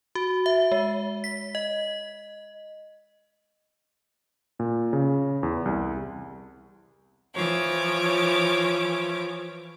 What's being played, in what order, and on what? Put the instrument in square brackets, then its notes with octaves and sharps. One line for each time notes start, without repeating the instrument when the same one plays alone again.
[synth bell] F#4
E5
G#3
B6
D#5
[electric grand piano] A#2
C#3
E2
C2
[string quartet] E3 F3 C#5 D6